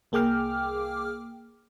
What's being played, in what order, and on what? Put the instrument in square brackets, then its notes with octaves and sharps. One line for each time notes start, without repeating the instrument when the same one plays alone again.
[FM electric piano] C2 A#3 G#4 G5 D6 F6